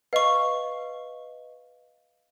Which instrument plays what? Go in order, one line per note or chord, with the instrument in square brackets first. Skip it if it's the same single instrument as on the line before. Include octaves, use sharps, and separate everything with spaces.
[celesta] B4 D#5 [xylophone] F5 C#6